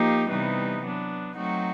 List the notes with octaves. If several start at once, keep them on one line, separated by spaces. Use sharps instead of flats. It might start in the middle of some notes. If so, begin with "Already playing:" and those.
Already playing: F3 A#3 D#4 G4
C3 E3 G3 B3 D#4
F#3 B3 D4
F#3 A3 C4 D#4 F#4